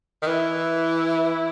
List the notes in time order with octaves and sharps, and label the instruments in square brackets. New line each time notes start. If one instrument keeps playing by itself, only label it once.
[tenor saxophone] D#3
[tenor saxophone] E3 [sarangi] E4